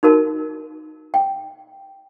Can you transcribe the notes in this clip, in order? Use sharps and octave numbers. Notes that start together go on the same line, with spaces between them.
D#4 F#4 A#4 A5
G5